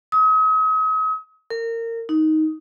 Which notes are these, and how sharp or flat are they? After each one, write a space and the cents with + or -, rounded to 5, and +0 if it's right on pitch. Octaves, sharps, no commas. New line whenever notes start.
D#6 +40
A#4 -25
D#4 +10